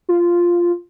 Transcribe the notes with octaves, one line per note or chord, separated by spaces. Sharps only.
F4